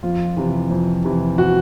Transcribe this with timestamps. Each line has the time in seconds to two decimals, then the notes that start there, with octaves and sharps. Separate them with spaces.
0.03 F2 F4
0.37 C3 E3
0.71 F2
1.04 C3 E3
1.38 F#4